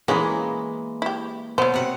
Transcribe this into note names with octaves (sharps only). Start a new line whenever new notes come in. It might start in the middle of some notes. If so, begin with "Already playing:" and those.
E3 G#3 A#3 B3 C#4 G#4
E4 G4
B2 F#3 C5
C3 F#5